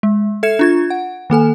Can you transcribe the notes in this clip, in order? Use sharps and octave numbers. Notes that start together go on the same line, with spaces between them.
G#3
A4 E5 G#6 C#7 E7
D4 F4 G#6
F#5
D#3 A#3 A4 G#5